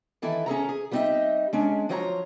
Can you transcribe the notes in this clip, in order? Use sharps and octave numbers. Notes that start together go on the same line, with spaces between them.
D#3 E3 E4 A4
C#4 G#4 A4 A#5
G#4
G3 B3 C4 D#4 D#5 E5
G#3 C#4 D4
F3 F#3 F4 C#5 F#5 A#5